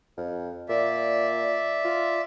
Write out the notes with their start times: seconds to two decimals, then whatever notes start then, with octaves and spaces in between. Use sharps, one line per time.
0.17 F2
0.69 A#2 D5 E5
1.84 F4